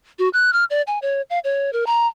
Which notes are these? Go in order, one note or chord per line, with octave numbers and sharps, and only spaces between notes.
F#4
F#6
F6
D5
G#5
C#5
F5
C#5
A#4
A#5